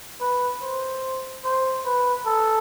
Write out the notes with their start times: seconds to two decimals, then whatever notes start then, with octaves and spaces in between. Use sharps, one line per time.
0.21 B4
0.63 C5
1.44 C5
1.85 B4
2.27 A4